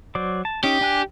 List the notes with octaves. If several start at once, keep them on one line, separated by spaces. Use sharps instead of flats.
F#3 C5 D5
A5
C#4 D#4 G4
D4 G#5 F#6